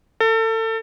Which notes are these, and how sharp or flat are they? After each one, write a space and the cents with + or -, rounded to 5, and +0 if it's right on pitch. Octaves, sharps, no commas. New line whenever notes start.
A4 +30